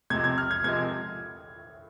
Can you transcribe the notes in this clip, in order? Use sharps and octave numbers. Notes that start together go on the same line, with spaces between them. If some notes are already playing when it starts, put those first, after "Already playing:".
C3 F3 G#3 G#6
G#6
F6
G#6
C3 F3 G#3 G#6